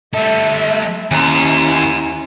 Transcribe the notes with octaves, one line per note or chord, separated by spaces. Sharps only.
G3 A3 A4 E5
D#2 C#4 E4 G#5 A#5